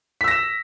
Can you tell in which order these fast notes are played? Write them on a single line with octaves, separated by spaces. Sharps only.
B6 E6 A#6 E7